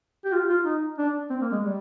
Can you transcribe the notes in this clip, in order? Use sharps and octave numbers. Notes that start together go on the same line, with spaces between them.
G4
F4
F4
D#4
D4
C4
A#3
G#3
G3